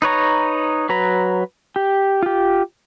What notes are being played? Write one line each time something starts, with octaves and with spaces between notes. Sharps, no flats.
D#4 B4 C#5 A#5
F#3 B4 A#5
G4
F4 G4